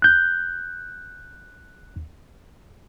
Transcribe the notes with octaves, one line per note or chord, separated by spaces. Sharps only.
F#6 G6